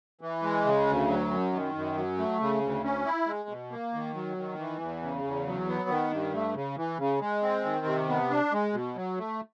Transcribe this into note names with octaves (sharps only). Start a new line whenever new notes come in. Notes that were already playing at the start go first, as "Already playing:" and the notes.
E3
G#3
C#3
D2
F#3
F#2
D#3
F#2
F#3
A3
C#3
D2
C#4
E4
G#3
B2
A#3
D#3
F#3
D#3
E3
E2
C#3
E2
F#3
B3
D#3
G2
A3
C#3
E3
C#3
G#3
C4
D#3
C3
B3
D4
G#3
B2
F#3
A3